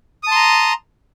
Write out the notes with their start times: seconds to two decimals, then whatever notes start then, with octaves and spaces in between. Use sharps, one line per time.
0.23 D#6
0.27 A5
0.31 C6
0.35 A#5